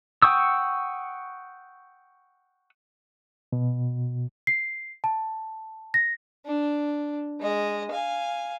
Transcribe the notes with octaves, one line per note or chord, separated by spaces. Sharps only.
F#5 G5 C#6 D#6 E6
B2
C7
A5
A#6
D4
G#3 D#5
F5 G#5